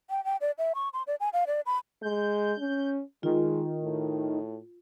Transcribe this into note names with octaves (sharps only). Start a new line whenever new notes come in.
G5
G5
D5
E5
C#6
C6
D5
G#5
F5
D5
B5
G#3 G6
C#4
D#3 G#3 F4
A2